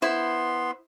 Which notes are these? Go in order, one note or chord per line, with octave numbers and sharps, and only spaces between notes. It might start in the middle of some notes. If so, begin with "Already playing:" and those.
B3 E4 C5 C6